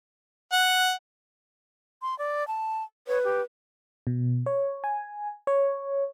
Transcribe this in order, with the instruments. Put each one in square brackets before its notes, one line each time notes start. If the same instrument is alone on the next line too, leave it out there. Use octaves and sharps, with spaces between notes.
[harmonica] F#5
[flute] C6
D5
A5
[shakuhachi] B4 [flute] C#5
[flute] G4
[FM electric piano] B2
C#5
G#5
C#5